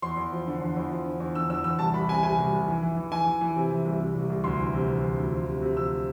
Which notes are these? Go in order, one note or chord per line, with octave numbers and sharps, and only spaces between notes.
E2 C6
E2
F3
D3
E2
E2
F3
D3
E2
D3 E6
E2 E6
E2 E6
C2 A5
C2 B5
C3 G#5
C2 G#5
C2
C2
E3
E3
E3
E3 G#5
E3
E3
C3
E3
C2
C3
C2
C2
D2 C6
E3
C3
E3
D2
D2
F3
C3
C3
F3 E6